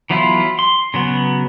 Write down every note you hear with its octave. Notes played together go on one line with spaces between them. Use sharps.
E3 F#3 B3 E4 F4
C6
C#3 F#3 B3